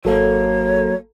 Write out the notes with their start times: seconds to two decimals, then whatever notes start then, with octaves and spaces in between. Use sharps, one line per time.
0.05 G#1 F#3 A#3 A4 C#5